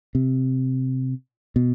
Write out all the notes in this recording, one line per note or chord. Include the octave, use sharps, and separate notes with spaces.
C3
B2